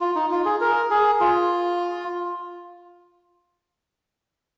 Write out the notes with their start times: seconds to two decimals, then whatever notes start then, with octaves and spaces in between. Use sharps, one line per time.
0.01 F4
0.16 D#4
0.31 F4
0.45 G#4
0.61 A#4
0.90 G#4
1.21 F4